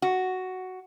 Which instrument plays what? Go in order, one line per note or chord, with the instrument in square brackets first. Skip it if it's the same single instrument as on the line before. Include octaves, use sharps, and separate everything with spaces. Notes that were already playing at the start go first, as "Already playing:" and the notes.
[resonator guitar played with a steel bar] F#4